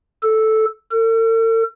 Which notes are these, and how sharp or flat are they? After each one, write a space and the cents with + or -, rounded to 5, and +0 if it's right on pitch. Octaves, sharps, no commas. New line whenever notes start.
A4 -5
A4 +45